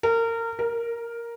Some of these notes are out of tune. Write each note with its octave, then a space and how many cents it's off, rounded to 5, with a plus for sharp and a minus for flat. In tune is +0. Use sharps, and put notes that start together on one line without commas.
A#4 -25
A#4 +5